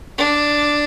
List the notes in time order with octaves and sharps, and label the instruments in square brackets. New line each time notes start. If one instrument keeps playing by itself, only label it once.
[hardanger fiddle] D4